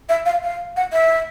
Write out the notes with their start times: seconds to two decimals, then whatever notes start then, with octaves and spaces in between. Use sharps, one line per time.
0.09 E5
0.26 F5
0.44 F5
0.76 F#5
0.93 E5